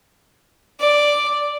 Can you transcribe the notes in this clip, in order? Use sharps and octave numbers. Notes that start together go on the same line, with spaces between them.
D5